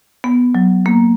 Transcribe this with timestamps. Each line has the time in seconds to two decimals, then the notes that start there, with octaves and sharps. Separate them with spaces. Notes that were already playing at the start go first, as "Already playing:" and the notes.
0.24 B3
0.55 F#3
0.86 A#3